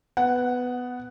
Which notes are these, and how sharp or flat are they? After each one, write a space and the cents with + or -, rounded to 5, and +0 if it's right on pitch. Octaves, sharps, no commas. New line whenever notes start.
B3 +10 F#5 +0